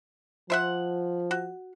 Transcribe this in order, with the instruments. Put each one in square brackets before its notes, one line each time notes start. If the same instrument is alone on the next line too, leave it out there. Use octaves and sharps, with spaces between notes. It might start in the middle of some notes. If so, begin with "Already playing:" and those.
[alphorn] F3 [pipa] C5 E5 F#5
[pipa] F#4